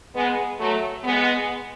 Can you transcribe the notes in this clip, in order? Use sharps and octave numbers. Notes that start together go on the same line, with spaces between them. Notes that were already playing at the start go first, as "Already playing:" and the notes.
G#3 B3
F#3 A3
G#3 B3